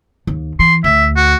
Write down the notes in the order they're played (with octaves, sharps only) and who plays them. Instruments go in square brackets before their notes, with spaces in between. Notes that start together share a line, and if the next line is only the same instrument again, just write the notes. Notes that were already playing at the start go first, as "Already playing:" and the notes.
[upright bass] D#2
[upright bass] E3 [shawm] C6
[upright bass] D2 [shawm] E5
[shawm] F#4